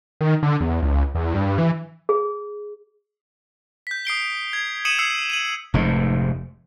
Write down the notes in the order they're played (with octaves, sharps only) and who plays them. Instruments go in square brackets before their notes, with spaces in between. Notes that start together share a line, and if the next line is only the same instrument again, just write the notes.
[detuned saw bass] D#3
D3
E2
C#2
E2
G2
E3
[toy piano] G#4
[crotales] G6 B6
D#6 C7 D7 G7
G#6
D#6 C#7 D#7 E7 F#7
E6 G#6 C7 C#7
D#7 E7 F#7
[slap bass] F1 G#2